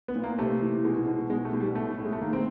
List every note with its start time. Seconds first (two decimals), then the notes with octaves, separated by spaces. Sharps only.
0.08 B3
0.16 A#2
0.24 A#3
0.39 C3 A3
0.61 E3
0.84 B2 G#3
1.07 B2
1.30 B2 G#3
1.45 A3
1.53 B2
1.60 G3
1.75 A2 A3
1.98 A2
2.05 G#3
2.13 A3
2.21 D#3 A#3
2.33 C4